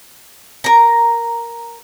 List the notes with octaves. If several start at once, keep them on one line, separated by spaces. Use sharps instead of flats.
A#4 A#5